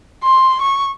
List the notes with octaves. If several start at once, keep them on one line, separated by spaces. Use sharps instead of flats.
C6
C#6